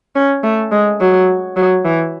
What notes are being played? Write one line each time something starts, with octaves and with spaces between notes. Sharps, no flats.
C#4
A3
G#3
F#3
F#3
E3